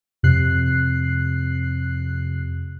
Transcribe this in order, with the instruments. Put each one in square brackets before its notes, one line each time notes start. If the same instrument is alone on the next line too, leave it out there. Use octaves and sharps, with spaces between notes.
[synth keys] F2 C3 F#6 C7